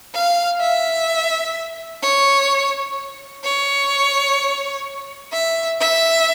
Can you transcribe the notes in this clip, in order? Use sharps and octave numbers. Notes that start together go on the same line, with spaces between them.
F5
E5
C#5
C#5
E5
E5